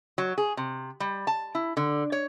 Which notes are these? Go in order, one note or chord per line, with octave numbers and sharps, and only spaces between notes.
F#3
G#4
C3
G3
A5
E4
D3
C#5